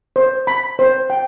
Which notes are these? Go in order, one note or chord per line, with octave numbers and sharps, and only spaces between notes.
C5
B5
C5
G5